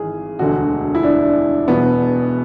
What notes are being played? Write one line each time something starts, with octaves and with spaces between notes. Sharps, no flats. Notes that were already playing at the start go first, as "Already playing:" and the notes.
Already playing: G#1 E3 G#4
E1 D2 D3 F#4
E4
D4
E1 E2 B2 B3